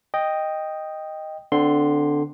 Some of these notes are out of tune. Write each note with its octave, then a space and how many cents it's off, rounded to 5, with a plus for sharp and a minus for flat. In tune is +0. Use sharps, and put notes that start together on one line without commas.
D#5 +0 G5 +5
D3 +0 C4 -35 C6 +0